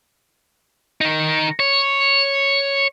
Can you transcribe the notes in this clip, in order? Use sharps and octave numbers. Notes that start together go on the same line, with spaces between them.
D#3 D#4
C#5